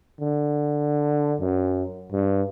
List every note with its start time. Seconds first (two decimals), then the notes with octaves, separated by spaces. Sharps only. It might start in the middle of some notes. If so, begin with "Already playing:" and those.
0.20 D3
1.40 F#2
2.12 G2